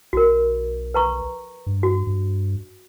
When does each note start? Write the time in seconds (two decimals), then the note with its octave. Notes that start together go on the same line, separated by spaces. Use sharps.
0.13 B1 F#4 A#4
0.94 B4 A#5 C#6
1.66 G2
1.83 F#4
2.07 G2